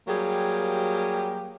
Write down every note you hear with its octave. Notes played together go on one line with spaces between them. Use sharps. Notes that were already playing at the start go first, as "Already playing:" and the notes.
F#3 G3 A#3 G4 G#4